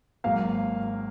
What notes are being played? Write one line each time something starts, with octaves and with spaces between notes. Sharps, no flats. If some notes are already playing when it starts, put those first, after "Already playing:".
G#1 G#2 F#3 A#3 F5